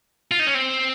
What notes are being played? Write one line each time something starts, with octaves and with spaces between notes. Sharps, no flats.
F4
D#4
C#4
C4